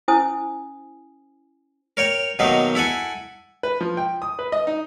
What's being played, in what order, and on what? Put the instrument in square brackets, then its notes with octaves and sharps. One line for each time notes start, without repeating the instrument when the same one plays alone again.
[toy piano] C#4 E4 C5 G#5 D#6
[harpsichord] A#4 C#5 G5
B2 D#3 F#3 A3 A#3 D#4
E4 A4 F#5 G#5
[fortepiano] B4
F3
G5
D#6
B4
D#5
D#4